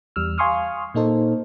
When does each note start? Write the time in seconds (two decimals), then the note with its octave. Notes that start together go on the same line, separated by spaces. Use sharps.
0.16 E2 G3 E6 F6
0.38 F5 G#5 C6 C#6 D#6 F6
0.94 A#2 A#3 D#4 A4 C5